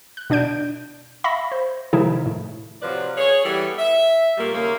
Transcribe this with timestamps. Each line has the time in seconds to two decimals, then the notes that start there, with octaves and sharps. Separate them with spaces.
0.17 F#6
0.30 B2 D4 D5 G6 D7
1.24 E5 F5 B5 C#6 A#6
1.52 C5
1.93 C3 D#3 F3 G#3 D#4 E4
2.26 A2
2.82 C3 F3 F#3 B4 D5
3.17 G#4 C#5
3.44 E3 G3 B3 E4 A4
3.78 E5
4.37 A#2 G3 A3 A#3
4.53 D#2 C#3 A#3